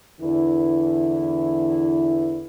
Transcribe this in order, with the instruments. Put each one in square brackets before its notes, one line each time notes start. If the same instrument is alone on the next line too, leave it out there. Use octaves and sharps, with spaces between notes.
[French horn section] E2 D3 E3 E4